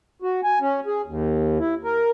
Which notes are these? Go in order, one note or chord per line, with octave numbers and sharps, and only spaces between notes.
F#4
G#5
C#4
G#4
D#2
E4
A#4